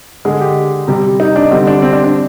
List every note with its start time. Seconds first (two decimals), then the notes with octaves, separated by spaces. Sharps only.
0.25 D3 G#3 G#4
0.41 G4
0.88 C3 G3
1.20 D#4
1.36 D4
1.51 D3 G3 C4
1.67 D4
1.82 C4
1.93 D4
2.04 D4